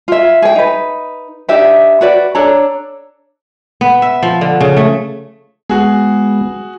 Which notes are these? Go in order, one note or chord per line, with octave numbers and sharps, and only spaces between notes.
F4 E5
G#4 G5
D#4 B4
D4 D#4 G4 E5
F#4 B4 D5
D4 A4 C#5 A#5
B3
E5
F3
D3
C#3
A3
G#3 B3 F#4 G#4